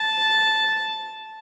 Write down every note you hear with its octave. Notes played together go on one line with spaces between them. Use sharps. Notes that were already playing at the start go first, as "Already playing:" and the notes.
Already playing: A5